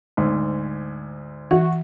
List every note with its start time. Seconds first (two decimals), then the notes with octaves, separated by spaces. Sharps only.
0.17 D2 G#2
1.51 E3 F#4